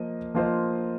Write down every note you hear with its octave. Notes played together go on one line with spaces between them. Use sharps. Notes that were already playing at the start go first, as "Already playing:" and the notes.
Already playing: F3 A#3 F4 D#5
F3 A#3 F4 C5 D#5